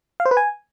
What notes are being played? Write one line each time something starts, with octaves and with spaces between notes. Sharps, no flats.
F5
C5
B4
G#5